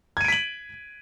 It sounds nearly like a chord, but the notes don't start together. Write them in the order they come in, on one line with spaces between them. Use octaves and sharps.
G#6 D#7 D7 B6 F#7